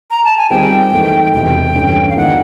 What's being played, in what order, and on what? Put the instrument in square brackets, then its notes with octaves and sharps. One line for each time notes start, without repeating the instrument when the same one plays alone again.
[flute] A#5
A5
G#5
[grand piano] D#3 G3 C4 F4 G#4 [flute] G5
[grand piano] G#2 E3 A3
[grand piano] E1 E2 C3 E3 [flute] G5
[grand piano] G2 E3 A3 C#4
[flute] F5
[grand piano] D#3 G#3 B3 D4 F4 [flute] F#5